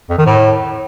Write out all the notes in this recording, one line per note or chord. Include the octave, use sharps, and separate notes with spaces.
F2
D#3
A2